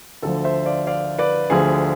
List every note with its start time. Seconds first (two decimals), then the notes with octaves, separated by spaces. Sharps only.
0.22 D2 D3 F3 A4
0.44 C5 E5
0.65 D5 F5
0.87 D5 F5
1.19 B4 D5
1.50 D2 D3 F3 G#4